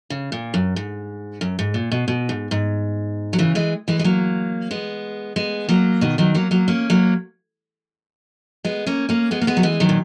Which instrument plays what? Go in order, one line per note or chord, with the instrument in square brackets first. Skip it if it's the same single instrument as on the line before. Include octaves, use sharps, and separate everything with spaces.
[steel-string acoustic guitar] C#3
A#2
F#2
G#2
F#2
G#2
A#2
B2
B2
G#2
G#2
F#3
C#3 E3
E3 G#3
E3 G#3
G#3
F#3 A#3
G#3 B3
G#3 B3
F#3 A#3
B2 D#3
D#3 F#3
F#3 A#3
F#3 A#3
A#3 C#4
F#3 A#3
G#3 B3
A#3 C#4
A#3 C#4
G#3 B3
A#3
G#3 B3
F#3
E3 G#3
D#3 F#3
A#2